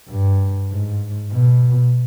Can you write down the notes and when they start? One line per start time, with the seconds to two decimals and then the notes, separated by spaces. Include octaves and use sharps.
0.09 G2
0.71 G#2
1.32 B2